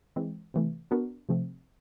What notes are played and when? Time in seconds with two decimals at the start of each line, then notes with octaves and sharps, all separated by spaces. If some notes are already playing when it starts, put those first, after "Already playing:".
0.16 E3 G#3 C4
0.54 C3 E3 A3
0.91 B3 D4 F#4 A#4
1.29 C3 F3 A3 C4